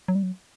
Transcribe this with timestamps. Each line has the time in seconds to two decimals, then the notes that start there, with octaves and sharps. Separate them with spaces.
0.08 F#3
0.15 G3
0.23 F#3